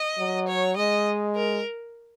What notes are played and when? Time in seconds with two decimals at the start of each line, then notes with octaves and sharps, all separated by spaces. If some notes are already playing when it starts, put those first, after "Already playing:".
Already playing: D#5
0.18 F#3
0.48 C#5
0.77 G#3 D#5
1.36 A#4